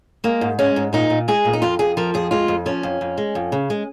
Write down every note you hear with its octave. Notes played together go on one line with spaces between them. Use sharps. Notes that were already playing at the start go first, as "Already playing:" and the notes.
G#3 A#3
G#2
G#3 C#4
G#2
A#2 D#4
A#2
G#3 G#4
A#2
D#4
F2 F4
F2 G#4
F3 A#4
F2 G#4
G#3 F4
F2
F3 C#4
F2
F2
G#3
F2
C#3
G#3